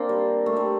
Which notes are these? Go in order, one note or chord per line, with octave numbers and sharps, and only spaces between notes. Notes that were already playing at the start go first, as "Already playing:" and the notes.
Already playing: A#3 C4 D4
G3
A3
G3